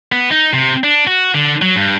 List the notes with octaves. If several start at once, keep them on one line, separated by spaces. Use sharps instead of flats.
B3
D#4
C3
D4
F#4
D3
F#3
G2